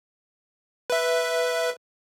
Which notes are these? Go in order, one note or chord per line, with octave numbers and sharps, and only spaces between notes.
B4 E5